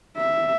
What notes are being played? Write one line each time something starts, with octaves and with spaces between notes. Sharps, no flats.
E5